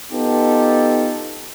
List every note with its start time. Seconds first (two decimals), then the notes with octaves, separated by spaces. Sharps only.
0.12 B3 D#4 F4 G4 A4